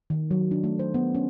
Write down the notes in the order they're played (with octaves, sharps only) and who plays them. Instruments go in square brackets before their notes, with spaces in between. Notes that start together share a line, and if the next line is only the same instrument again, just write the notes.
[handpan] D#3
F#3
D4
A3
C5
B3
C#4